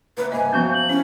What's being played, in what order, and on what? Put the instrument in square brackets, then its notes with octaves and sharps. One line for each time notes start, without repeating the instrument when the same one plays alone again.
[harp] C#3 E3 A#3 [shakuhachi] B4
[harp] G2 C3 A#3 [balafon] D#5 [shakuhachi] G#5
[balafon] F3 B3 C#4 [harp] F#4 F5 [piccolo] G6
[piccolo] F#7
[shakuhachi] C#4 [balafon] E4 [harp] C#5 F#5 G5